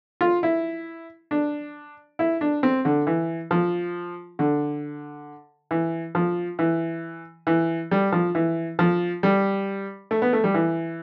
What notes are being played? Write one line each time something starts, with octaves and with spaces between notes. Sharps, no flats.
F4
E4
D4
E4
D4
C4
D3
E3
F3
D3
E3
F3
E3
E3
G3
F3
E3
F3
G3
A3
B3
A3
G3
E3